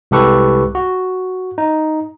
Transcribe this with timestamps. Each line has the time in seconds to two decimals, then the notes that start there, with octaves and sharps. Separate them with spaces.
0.11 C2 G#3 G4 A4 B4 C#6
0.75 F#4
1.58 D#4